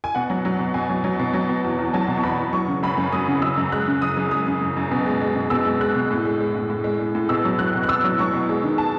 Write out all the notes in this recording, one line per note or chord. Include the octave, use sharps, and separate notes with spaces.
G#5
B2 F#5
F#3
F#3
B2
B2 G#5
F#3
F#3
B2
F#3
B2
E2
E2
F#3 A5
B2
C#6
E2 B5
E2
F#3 C#6
C#3
F#2 B5
F#2
F#3 D#6
C#3
F#2 E6
F#2
G#3 F#6
C#3
F#2 D#6
F#2
G#3 D#6
C#3
F#2
F#2
B2
G#3
G#3
B2
B2 E6
G#3
G#3 F#6
B2
A2
G#3
G#3
A2
A2
G#3
G#3
A2
B2 E6
F#3
F#3 F#6
B2
F#6
B2 E6
F#3
F#3 C#6
B2
G#3
D#3
A5